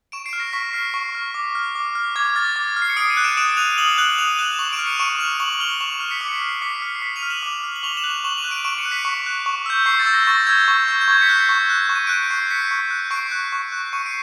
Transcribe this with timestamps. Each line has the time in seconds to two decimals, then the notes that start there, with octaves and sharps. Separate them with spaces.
0.12 C#6 D7 E7
0.26 C7 D7
0.33 F6
0.40 A#6
0.53 C#6 B6
0.73 F6 C7
0.94 C#6 C7
1.15 F6
1.34 D6
1.55 F6
1.75 D6
1.95 F6
2.16 D6 G#6
2.36 F6 A6
2.56 D6
2.76 F6
2.82 C7
2.90 C#7
2.97 D#6 C7 D7
3.10 C#7 D#7
3.17 F#6
3.24 D7 E7
3.37 D#6 D7 E7
3.57 F#6 D#7 F7
3.78 D#6 E7 F#7
3.98 F#6 E7 F#7
4.18 D#6 D#7 F7
4.39 F#6 E7 F#7
4.59 C#6 E7 F#7
4.73 D7 E7
4.79 F6
4.86 C#7 D#7
4.99 C#6 D7 E7
5.19 F6 D#7 F7
5.40 C#6 E7 F#7
5.52 F#7
5.60 F6 F7 G7
5.80 C#6 E7 F#7
5.91 D#7 F7
6.00 F6
6.11 B6 C#7
6.21 D6 B6
6.28 C#7
6.35 C7
6.42 F6
6.49 C7
6.61 D6 B6 C#7
6.82 F6 B6 C#7
6.95 C7
7.02 D6 B6 C#7
7.16 D#7 F7
7.23 F6
7.30 E7 F#7
7.43 D6
7.64 F6
7.76 F#7
7.83 C#6 F7 G7
7.97 E7 F#7
8.04 F#6
8.10 E7 F#7
8.24 C#6 E7 F#7
8.37 D#7 F7
8.44 F#6
8.51 D7 E7
8.64 C#6 D7 E7
8.78 C#7 D#7
8.85 F#6
8.91 B6 C#7
9.05 C#6
9.26 F#6
9.46 C#6
9.66 E6 G6
9.86 C#6 C7
10.00 A6
10.06 E6 G6
10.13 A#6
10.27 C#6 A6
10.47 E6 G6 G#6
10.68 C#6
10.88 E6 G6
11.01 G6
11.08 C#6 G#6
11.21 B6 C#7
11.29 F#6
11.35 C7
11.49 C#6
11.70 F#6
11.89 C#6
11.95 D#7
12.07 F#6 D7
12.18 C#7
12.30 C#6 C7
12.50 F#6 B6 C#7
12.71 C#6
12.90 F#6
13.11 C#6 C7 D7
13.31 F#6
13.52 C#6
13.72 F#6
13.92 C#6 C#7 D#7
14.06 C7 D7